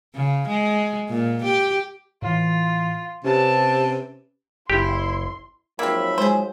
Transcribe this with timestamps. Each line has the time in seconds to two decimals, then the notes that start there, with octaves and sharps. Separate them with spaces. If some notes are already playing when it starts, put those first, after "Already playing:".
0.15 C#3
0.48 G#3
1.09 A#2
1.44 G4
2.22 A2 E3 F4
3.24 C3 C#4 G4 B4 A5
4.70 F#1 E4 G4 C6
5.79 G#2 F3 F#3 A#3 C4 E5 B5
6.18 G#3 G#4 C5